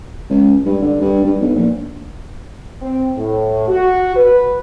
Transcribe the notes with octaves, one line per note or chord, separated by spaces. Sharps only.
C#2
G2
D3
G2
G2
B1
A#1
C4
A2
F#4
B4